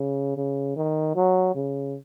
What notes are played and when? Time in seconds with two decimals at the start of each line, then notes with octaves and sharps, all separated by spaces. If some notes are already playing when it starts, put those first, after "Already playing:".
Already playing: C#3
0.37 C#3
0.76 D#3
1.16 F#3
1.55 C#3